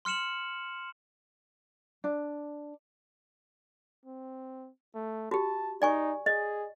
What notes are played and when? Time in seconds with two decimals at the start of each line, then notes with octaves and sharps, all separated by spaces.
0.05 C6 F6 C#7 E7 F#7
2.04 D4
4.05 C4
4.94 A3
5.31 F#4 G4 A5
5.82 D#4 D5 G#5 C#6
6.26 G#4 D#5